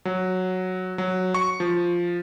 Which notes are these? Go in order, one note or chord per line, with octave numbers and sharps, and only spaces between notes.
F#3
F#3
C#6
F3